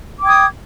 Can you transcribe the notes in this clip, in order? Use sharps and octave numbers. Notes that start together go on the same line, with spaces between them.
G5 D6 D#6 G#6